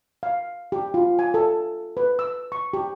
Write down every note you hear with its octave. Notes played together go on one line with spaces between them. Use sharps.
F5
G4
F4
G#5
A4
B4
E6
C#6
G4